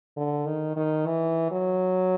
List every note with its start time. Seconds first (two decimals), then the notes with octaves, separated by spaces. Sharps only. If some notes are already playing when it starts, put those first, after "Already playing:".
0.17 D3
0.47 D#3
0.76 D#3
1.06 E3
1.51 F#3